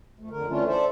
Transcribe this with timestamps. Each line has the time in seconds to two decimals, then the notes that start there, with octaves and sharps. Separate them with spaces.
0.19 F2 A3
0.30 F2 D3 A#4
0.48 D3 E3 A3 C#4 D4 F4
0.68 A4 C5 D5 E5